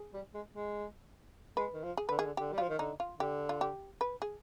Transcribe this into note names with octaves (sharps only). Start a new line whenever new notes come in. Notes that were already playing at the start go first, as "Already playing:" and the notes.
Already playing: G#4
G3
G#3
G#3
G#3 B4
D#3
F3
G#4
D3 B4
D#3 G#4
D3
D3 G4
G3
F3 F4
D#3
D3 D#4
F4
D3 G4
F4
G4
B4
G#4